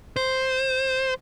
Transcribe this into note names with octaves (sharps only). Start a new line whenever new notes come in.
C5